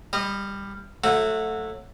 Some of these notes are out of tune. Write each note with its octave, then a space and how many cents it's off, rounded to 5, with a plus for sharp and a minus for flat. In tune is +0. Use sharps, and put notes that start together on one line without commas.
G3 +15 D#5 -20
F#3 -25 A3 +0 F#4 -20